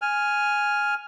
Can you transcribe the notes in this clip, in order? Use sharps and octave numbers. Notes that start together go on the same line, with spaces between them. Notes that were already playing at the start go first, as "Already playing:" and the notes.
G#5 F6